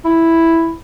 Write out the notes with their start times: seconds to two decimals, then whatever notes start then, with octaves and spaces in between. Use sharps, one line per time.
0.05 E4